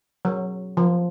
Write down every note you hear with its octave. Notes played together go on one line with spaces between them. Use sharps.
F#3
F3